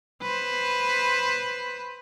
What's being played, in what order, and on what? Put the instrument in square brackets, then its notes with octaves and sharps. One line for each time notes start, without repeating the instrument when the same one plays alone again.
[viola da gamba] B4 C5